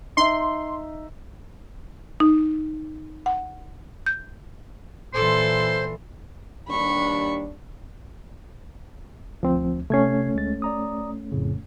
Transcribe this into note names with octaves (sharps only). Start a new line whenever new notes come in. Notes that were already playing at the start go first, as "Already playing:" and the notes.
D#4 E5 C6
D#4
F#5
G6
A#2 E3 A4 C5 C6
D#2 G3 D4 B5 C#6
D2 F3 C4
C3 A3 C#4 G#6 C7
D2 G#3 A6
D5 A#5 D#6
F2 A2 C#3